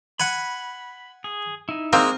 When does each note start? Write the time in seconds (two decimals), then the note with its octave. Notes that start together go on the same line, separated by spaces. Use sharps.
0.20 F#5 G#5 B5
1.24 G#4
1.69 D#4 E4
1.93 G#3 A#3 C4 F5 A#5 F6